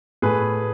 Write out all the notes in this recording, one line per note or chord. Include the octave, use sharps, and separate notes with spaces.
A2 G#4 B4